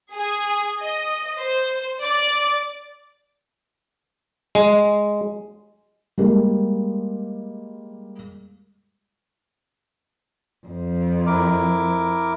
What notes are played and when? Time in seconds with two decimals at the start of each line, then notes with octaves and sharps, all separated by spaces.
0.14 G#4
0.83 D#5
1.39 C5
2.02 D5
4.55 G#3
6.18 G3 G#3 A#3
10.66 F2
11.26 E4 A#4 D6